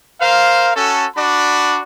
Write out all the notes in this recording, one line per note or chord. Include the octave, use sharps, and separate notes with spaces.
A#4 C5 F5
C#4 F#4 A4
D4 F#4 D5 B5